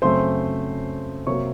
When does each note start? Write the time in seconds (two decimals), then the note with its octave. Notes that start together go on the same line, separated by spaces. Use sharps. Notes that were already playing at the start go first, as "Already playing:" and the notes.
0.02 F#2 C#3 A3 C4 C5 C6
1.27 C3 F#3 A#3 C#5 C#6